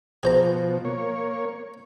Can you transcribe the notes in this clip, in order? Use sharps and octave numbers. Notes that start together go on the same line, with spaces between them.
B2 F3 G#4 C5 A#5
A#3 C#5